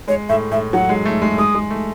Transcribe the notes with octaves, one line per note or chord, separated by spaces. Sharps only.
G#3 C#5
A2 E5
A2 E5
F#3 F#5
G#3
A3
G#3
G#3 D#6
G#3
A3